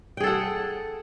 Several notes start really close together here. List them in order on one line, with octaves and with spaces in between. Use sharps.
G5 G#4 A4 F#5